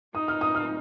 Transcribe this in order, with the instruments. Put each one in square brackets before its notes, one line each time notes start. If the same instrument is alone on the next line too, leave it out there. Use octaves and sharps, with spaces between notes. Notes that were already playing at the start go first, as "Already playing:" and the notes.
[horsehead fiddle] D#4 [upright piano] D#6
[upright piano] F6
D#6
F6